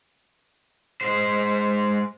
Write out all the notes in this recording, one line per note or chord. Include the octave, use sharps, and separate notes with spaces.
G#3 C5